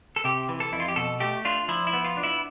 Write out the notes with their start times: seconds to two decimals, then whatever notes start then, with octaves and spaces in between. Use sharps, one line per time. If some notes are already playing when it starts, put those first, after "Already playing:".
0.16 A4
0.24 C3 G4
0.49 E3
0.60 A4
0.72 F2 E4
0.80 F4
0.88 G4
0.96 B2 A4
1.20 A3 G4
1.45 D4 F4
1.68 F3 E4
1.87 E4
1.93 B3
2.05 F4
2.17 D4
2.23 E4